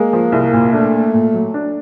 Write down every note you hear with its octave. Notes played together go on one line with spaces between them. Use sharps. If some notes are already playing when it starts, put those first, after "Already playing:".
Already playing: G#3 A#3
F3
C2
A#2
A3 D4
A#3
A#2
F#3
D4